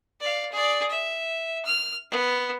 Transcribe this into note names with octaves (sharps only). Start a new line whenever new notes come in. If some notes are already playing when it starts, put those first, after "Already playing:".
D5 F5
G#4 D5
E5
F6
B3